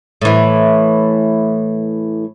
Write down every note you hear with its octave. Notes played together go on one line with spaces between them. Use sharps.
A2 E3